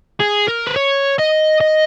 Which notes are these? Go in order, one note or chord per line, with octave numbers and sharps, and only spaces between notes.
G#4
A#4
B4
C#5
D#5
D#5